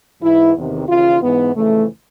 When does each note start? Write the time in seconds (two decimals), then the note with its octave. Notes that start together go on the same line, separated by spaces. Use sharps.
0.22 G#2 E3 E4
0.55 E2 C3 D#3
0.89 D#2 C#3 E3 F4
1.22 G#2 E3 B3
1.55 F2 C#3 E3 A3